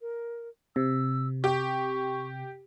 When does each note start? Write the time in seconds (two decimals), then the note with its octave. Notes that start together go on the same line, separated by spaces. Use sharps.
0.01 A#4
0.76 C3 E6
1.44 G4 C#6